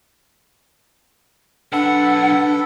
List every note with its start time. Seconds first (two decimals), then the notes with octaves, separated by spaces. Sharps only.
1.72 B1 D4 A4 B4 F#5